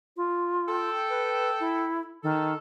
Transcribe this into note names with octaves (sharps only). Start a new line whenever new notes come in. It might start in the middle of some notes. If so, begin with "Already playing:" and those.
F4
A4 G5
B4
E4
D#3 A4